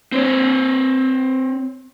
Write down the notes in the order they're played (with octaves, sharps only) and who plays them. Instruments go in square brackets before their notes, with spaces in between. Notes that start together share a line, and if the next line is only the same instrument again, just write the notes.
[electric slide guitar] C4 C5 C#5